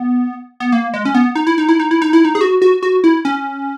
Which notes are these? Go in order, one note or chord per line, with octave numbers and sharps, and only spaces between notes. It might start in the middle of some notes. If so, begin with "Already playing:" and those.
Already playing: B3
B3
A#3
G#3
C#4
B3
D#4
E4
D#4
E4
D#4
E4
D#4
E4
D#4
G#4
F#4
F#4
F#4
E4
C#4